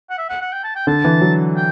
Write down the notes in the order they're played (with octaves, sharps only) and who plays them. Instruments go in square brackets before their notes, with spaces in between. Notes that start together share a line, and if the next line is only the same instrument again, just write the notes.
[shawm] F#5
E5
F#5
F#5
G5
A5
G5
[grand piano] D3 [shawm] A5
[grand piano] E3
F#3
[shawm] G5